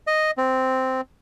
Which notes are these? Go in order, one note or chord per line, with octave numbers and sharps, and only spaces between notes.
D#5
C4